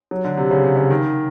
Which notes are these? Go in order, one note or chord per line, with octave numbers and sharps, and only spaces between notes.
F#3
D3
C3
C#3
C3
C#3
D#3